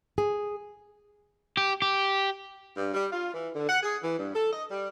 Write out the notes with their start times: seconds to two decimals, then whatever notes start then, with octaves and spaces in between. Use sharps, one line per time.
0.18 G#4
1.57 G4
1.82 G4
2.76 G2
2.93 G3
3.11 F4
3.34 E3
3.55 D3
3.67 F#5
3.83 G#4
4.02 E3
4.18 G2
4.34 A4
4.51 D#5
4.71 G3